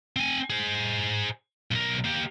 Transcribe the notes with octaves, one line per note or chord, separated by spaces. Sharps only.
C4 G#5
G#4 C5
B1 A#4
A#3 G4